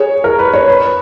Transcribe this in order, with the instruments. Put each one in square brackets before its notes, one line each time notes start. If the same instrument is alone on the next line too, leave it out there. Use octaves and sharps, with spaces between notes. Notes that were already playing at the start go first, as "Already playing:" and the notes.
Already playing: [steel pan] G#4 [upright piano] C#5
[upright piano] A#4
B4
C#5
B4